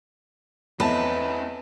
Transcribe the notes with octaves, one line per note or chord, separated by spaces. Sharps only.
E2 B3 C4 B4 C#5 D#5 E5 A5